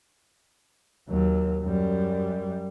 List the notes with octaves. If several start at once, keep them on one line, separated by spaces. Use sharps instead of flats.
D#2 F#3
F#2 G3